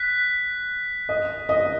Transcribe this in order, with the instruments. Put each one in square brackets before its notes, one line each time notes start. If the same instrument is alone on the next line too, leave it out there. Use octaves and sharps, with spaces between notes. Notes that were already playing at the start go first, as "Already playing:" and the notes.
Already playing: [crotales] F#6 B6
[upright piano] D#5
D#5